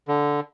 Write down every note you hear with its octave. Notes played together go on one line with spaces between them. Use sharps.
D3